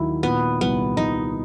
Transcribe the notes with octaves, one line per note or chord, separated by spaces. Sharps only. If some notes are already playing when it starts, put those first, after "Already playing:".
Already playing: D#2 D#3 F#3 E4
A#2 B3
C2 B3
C2 D#4